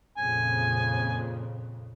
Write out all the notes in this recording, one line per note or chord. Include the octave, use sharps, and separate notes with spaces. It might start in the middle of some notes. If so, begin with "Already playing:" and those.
F2 A#2 C#3 G#5